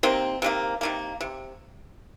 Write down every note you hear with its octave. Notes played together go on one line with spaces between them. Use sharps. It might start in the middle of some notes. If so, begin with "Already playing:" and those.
C3 D#3 A#3 C4
C3 D#3 A#3
C3 D#3 A#3
C3